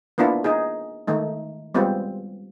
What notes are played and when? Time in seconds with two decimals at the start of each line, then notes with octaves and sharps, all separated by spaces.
0.18 A#3 B3 D4 E4 F4
0.44 D#4 G#4
1.07 D#3 G#3 A3 D#4
1.75 G3 G#3 B3 C4 F4